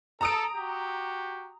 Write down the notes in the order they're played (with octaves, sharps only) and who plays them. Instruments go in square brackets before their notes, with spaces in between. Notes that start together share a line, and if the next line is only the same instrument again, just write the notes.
[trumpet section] A4 [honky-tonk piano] A#5 D#6 D7
[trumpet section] F#4 G4